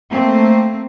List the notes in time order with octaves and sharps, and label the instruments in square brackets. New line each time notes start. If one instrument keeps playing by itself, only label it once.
[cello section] A3 A#3 C4